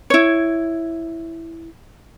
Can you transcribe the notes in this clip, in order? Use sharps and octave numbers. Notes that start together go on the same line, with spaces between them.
E4 C#5